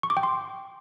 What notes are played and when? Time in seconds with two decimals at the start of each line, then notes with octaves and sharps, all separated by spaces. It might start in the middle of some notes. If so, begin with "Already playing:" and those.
0.03 C#6
0.10 D6
0.17 G5
0.23 C6